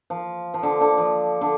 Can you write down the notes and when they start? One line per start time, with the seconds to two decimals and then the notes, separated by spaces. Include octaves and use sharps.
0.10 F3
0.54 F3
0.63 D3
0.81 D3
0.98 F3
1.41 D3